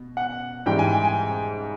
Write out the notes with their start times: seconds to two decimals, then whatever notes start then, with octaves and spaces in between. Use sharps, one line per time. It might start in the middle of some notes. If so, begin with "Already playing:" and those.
Already playing: B2
0.17 F#5
0.66 G#2 E3 G3 G5
0.79 G#5
0.91 G5
1.05 G#5